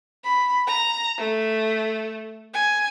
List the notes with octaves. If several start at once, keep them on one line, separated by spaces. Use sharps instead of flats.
B5
A#5
A3
G#5